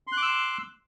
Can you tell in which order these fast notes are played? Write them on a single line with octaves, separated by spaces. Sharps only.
C6 F#6 D6 E6